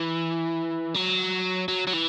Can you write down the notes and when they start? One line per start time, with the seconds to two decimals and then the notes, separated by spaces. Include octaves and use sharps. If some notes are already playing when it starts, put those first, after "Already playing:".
Already playing: E3
0.94 F#3
1.68 F#3
1.87 F#3
1.93 E3